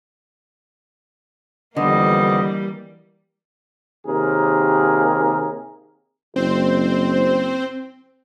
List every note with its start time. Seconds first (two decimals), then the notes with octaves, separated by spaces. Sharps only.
1.77 F2 D3 E3 G3 A#3 B3 D#5
4.06 D#2 C3 G#4 A#4
6.36 F#1 C4 C5